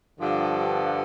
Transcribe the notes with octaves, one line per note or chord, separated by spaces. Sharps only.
G2 D3 F3